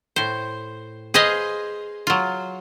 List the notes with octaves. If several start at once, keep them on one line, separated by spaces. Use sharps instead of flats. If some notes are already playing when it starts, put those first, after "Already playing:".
A2 C5
G#4 B4 C5 D#5 F5 G#5
F#3 F4